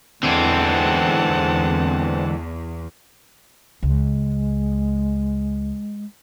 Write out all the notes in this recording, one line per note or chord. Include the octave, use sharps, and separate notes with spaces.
E2 D3 E3 G#3 C4 F#5 A5
C#2 G#3